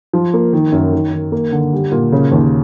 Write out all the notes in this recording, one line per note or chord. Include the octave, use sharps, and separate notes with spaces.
F3
A#3
D#3
F#2
D#3
D#3
A#3
D3
G3
A#2
C#3
D#2